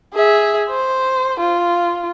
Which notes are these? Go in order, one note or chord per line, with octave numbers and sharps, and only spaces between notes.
G#4 E5
C5
F4